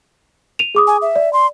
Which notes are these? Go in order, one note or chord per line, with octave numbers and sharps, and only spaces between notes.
D#7 F7
G#4 D6 D#6
G#5
E5
D5
C6